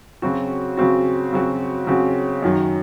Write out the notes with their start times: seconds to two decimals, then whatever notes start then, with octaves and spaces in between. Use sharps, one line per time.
0.22 C#3 F#3 C4 F#4
0.77 C#3 F#3 C4 F#4
1.33 C#3 F#3 C4 F#4
1.87 C#3 F#3 C4 F#4
2.42 F#2 D#3 F#3